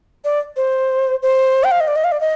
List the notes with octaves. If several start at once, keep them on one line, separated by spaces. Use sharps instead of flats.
D5
C5
C5
G5
F5
D#5
D5
D#5
F5
D5
D#5